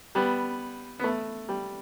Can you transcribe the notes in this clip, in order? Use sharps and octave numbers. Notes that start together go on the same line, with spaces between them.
G3 B3
B3
A3
G3